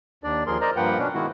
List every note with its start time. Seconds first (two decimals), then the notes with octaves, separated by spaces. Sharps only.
0.24 D#2 D4 D5
0.47 D#2 F3 G#4 A#4 C6
0.61 A#4 C5 D5 D#5 A#5
0.76 G2 F3 A#3 B4 F#5 G5
0.98 B2 C#4 D4
1.14 D#3 G#3 B3 E4 F#4